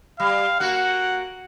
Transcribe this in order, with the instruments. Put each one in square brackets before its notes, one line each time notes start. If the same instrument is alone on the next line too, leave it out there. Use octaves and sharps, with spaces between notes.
[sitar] G3 [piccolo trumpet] F5
[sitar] A#3 F#4 [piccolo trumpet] F#5